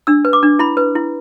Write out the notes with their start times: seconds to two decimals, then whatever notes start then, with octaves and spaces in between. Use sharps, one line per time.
0.07 D4 E6
0.25 B4
0.33 D6
0.43 D4
0.59 E4 B5
0.77 B4
0.95 E4